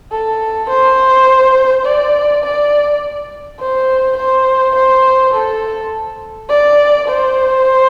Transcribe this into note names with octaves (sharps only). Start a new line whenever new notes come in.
A4
C5
D5
D5
C5
C5
C5
A4
D5
C5